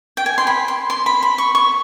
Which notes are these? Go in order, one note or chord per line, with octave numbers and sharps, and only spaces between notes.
G5
G#5
C6
B5
C6
C6
B5
B5
C#6
C#6